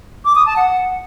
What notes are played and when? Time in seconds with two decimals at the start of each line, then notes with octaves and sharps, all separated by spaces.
0.25 D6
0.35 D#6
0.46 A5
0.57 F#5